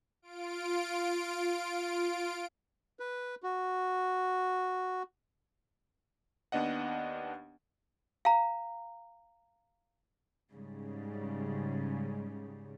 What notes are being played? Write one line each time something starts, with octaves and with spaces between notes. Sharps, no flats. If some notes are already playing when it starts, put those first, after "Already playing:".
F4 D7
B4
F#4
D#2 B3 D4 D#5 F#5
F5 A#5
G#2 C#3 G3